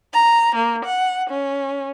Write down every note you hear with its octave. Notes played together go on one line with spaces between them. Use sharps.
A#5
A#3
F#5
C#4